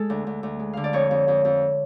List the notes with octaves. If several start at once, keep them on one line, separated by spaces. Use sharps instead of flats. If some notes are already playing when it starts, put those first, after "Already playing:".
Already playing: G#3 A4
D2
D2
D2
G#3
D3 F5
D5
F2 C#5
F2
F2
F2